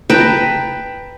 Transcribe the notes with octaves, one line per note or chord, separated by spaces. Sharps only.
B4 G5 A5 A#5